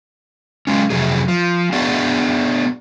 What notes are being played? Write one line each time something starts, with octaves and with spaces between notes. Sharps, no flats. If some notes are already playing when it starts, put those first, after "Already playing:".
F#3 G#3 C#4
F2 C3 F#3 G#4
F3
B3 D4 F#4 G#4 F5